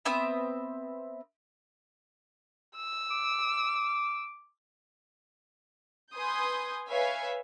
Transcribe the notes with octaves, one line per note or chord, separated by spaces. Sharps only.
B3 C4 E5 D#6
E6
D6
B4 G#5 C6 D#6 G6
B4 C#5 E5 F5 G#5